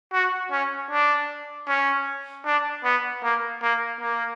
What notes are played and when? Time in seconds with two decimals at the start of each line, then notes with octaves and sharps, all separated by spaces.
0.13 F#4
0.51 C#4
0.91 D4
1.68 C#4
2.46 D4
2.84 B3
3.23 A#3
3.63 A#3
4.01 A#3